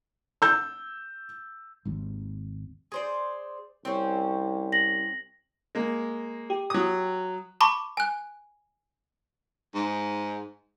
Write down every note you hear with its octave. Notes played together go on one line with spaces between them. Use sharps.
E6 G6
G#1 D#2
G#4 C5 D5
C2 C4 C#4
A#6 F#7
G#3 A#3
G4
F#3 D#6
A5 B5 C#6 D6
G#5 F#6
G#2